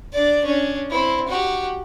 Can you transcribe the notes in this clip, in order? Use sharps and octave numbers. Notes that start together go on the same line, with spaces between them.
D4 D5
C#4 D4
C4 E4
F#4 G4